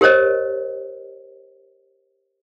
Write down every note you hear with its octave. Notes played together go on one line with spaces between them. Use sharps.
G4 A#4 C5 C#5 D#5